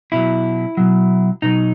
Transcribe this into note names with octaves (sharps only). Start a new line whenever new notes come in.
B2 F#3 E4
B2 F#3
B2 F#3 D#4